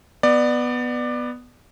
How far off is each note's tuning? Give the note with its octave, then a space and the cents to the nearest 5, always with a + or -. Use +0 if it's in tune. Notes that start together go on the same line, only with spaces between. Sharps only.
B3 +0 D5 +20